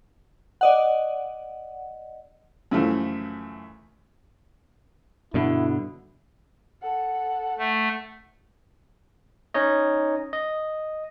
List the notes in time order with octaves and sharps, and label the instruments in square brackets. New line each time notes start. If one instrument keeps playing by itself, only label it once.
[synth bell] D5 D#5 F#5
[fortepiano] F#2 C#3 E3 F3 A3
[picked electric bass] G2 B2 D3 [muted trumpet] E4
[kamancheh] A4 F#5
[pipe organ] A3
[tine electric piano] C#4 D#4 C#5 D#5
D#5